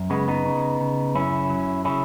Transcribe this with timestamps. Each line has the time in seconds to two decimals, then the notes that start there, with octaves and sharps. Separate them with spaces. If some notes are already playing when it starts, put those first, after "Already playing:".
Already playing: F#2
0.10 C#3 G#3 B3
0.28 B3 D#4
0.46 C#3
0.80 C#3
1.15 F#2 C#4 E4
1.50 F#3
1.85 C#3 C#4 E4